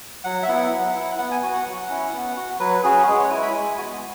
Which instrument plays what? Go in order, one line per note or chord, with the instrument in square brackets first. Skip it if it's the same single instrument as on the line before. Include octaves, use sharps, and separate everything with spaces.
[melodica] F#3 F#5
E5
B3 E4 F#5
F#3
E4
B3 F#5
G#5
F#4 G#5
F#5
F#3
C#4 E4
B3
F#4
F#3 B4
C#4 F#4 G#4
G#3 B4
C#5
E4 G#5
B5
G#3 G#5
B3 F#4 G#5